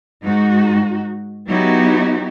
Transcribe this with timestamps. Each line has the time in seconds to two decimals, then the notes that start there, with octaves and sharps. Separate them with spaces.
0.22 G#2 D#4 F#4
1.47 F#3 B3 D#4 E4 F#4 G4